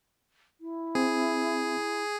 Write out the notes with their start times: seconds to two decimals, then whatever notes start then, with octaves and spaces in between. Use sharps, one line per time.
0.60 E4
0.95 C4 G#4